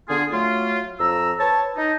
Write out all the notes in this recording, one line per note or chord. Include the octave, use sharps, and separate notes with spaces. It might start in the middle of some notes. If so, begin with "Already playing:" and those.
D3 B3 F4 G#4
F#3 A3 F4
F2 A#5 E6
B4 C#5 A5
D#4